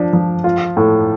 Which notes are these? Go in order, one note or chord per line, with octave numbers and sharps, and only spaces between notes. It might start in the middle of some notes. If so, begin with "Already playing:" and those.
Already playing: F3 D4
F3
F4
A2